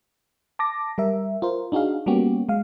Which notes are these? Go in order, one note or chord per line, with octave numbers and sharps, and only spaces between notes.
A5 D6 A#6
G3 A#4 E5
F4 A#4 C5
D4 D#4 F#4 G#4 F5
G3 A#3 B3 C#4 F#4 G4
G#3 F5